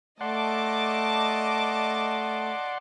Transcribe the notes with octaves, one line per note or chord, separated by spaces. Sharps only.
A3 D5 D#5 F#5 A5 C6 D6